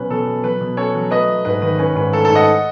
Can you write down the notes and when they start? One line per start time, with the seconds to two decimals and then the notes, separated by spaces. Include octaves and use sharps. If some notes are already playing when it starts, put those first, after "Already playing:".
Already playing: B2 F#3 C#4 B4
0.10 B2 A4
0.27 B2
0.43 F#3 B4
0.61 B2
0.77 C#4 A4 C#5
0.95 F#3
1.11 A3 B4 D#5
1.29 A3
1.45 G#2 B4
1.62 D#3 B4
1.78 C#4 B4
1.95 G#2 B4
2.12 A3 A4
2.25 G#2 A4
2.35 D#5 F#5